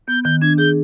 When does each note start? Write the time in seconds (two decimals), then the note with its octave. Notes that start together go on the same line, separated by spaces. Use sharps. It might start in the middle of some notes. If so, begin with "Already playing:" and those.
0.08 B3 G6
0.24 D#3 G6
0.41 D4 G#6
0.58 G#4 G6